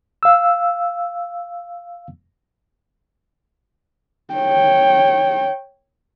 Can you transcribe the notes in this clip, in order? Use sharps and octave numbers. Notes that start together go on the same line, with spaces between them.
F5 E6
C#5 G5